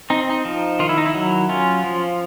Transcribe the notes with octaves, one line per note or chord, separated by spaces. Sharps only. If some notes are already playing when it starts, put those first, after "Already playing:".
C4 D#4
D#4
F3
D#3 F4
E4
D#4
E4
F#3
C#4 F4
F3